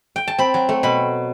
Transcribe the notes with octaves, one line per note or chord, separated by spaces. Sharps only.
G5
A5
C4 B5
F#3
A3
B2 B5